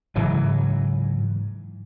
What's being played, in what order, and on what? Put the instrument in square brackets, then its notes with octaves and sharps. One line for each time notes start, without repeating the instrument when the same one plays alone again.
[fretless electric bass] G#2 C#3 E3 F#3